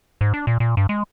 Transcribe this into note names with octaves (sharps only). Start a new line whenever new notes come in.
G#2
D4
A#2
A#2
G2
G#3